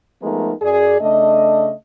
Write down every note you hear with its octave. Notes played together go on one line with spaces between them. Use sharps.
F3 G#3 A3 B3 D#4 A#4
F#2 G#4 D5
C#3 A3 D4 D#5